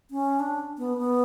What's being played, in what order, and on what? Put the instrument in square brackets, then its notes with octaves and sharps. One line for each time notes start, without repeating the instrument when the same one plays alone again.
[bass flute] C#4
D4
B3
B3